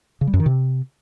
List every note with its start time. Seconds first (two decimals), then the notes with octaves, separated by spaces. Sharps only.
0.21 C#3
0.27 G3
0.34 F#2
0.40 D#3
0.46 C3